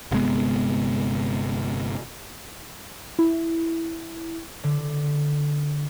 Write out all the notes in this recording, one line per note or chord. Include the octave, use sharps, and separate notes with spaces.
G1 C3 G#3 B3
E4
D3